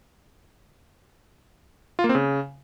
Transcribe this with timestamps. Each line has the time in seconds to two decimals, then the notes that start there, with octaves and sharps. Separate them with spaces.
1.99 F4
2.04 A#3
2.09 C4
2.15 C#3